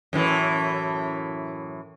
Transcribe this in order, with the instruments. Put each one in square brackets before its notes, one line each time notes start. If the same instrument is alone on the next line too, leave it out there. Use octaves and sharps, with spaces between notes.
[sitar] F#2 A2 E3